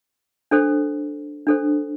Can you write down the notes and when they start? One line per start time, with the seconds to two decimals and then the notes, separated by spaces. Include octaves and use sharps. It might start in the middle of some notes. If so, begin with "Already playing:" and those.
0.51 D4 A4 C5
1.47 D4 A4 C5